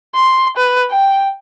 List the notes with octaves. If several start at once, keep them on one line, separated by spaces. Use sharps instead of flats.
C6
B4
G5